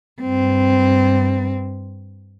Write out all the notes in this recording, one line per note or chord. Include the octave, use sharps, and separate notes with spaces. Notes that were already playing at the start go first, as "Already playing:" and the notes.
G2 C4